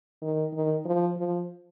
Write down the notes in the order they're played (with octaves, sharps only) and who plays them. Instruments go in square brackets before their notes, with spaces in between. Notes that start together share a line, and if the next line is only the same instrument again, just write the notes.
[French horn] D#3
D#3
F3
F3